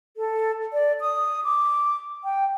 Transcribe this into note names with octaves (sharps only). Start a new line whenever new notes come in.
A4
D5
D#6
D6
G5